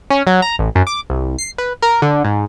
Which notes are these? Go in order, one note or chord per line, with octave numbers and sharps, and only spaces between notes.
C#4
F#3
A#5
A1
F#2
D6
C2
C7
B4
A#4
D3
G#2